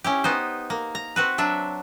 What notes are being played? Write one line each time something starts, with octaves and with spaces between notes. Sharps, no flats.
C#4 E4 G4
B3 D#4 C5
A#3
A#5
C4 F#4 B4
F#3 D4 E5